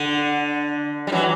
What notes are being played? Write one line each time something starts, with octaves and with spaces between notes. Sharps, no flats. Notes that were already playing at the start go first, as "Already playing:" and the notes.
Already playing: D3
G3
E3 F#3